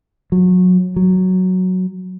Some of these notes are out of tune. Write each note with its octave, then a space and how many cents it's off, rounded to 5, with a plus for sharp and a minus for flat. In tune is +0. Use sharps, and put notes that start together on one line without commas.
F#3 -25
F#3 +0